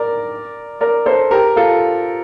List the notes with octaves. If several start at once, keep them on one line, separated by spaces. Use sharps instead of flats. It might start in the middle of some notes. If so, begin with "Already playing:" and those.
Already playing: A#4 D5
A#4 D5
A4 C5
G4 A#4
F4 A4